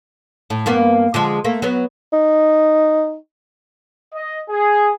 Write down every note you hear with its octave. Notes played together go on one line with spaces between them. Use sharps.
A2
G2 A#3 B3
D3 F3 G#3
A3 A#3
F#3 B3
D#4
D#5
G#4